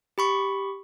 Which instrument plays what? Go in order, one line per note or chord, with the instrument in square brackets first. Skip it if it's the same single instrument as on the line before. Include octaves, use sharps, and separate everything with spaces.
[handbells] G4 B5 C#6